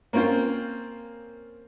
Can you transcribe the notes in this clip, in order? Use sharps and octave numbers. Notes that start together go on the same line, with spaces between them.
A#3 C4 C#4 F4 C5